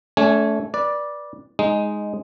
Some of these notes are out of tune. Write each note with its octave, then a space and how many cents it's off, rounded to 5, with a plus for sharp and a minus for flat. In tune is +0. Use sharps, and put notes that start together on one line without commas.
A3 -15 C#4 +45 G#5 +0
B4 -25 D5 +0
G#3 +0 D#4 +0